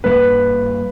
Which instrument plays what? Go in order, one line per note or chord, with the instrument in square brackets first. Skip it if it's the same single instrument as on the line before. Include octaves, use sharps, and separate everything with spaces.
[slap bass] G2 G3 A#3 C#4 [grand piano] B4